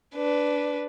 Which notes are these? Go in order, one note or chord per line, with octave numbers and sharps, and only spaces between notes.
D4 B4